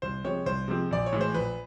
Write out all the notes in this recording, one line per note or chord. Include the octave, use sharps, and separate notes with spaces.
C2 C5
C3 F3 G#3 C4 C#5
C2 C5
C3 F3 G#3 C4
A#1 D5
C#5
A2 E3 G#3
C5
A#1 B4